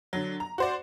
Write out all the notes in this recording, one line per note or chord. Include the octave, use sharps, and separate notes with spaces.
D3 F#3
A#5
F#4 C5 D5